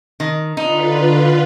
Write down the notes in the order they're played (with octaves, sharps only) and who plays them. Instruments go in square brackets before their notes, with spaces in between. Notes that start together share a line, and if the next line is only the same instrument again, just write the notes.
[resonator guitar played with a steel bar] D#3
[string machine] D3 F4 B4 [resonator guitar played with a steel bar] D#4